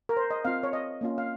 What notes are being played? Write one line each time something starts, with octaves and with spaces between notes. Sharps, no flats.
A#4
C5
D#5
C4 F4 F5
C#5
D#5
A#3 C#4 F4
F5